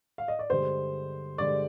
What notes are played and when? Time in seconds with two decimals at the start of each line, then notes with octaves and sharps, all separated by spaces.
0.18 F5
0.28 D#5
0.39 D5
0.50 G2 D3 G#3 C5
1.38 G2 D3 G#3 D5